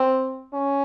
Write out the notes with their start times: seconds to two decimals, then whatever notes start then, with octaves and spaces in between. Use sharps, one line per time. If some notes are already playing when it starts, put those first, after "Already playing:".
Already playing: C4
0.53 C#4